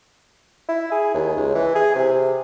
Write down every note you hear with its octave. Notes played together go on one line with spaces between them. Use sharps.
E4
G#4
D#2
C#2
E3
G#4
C3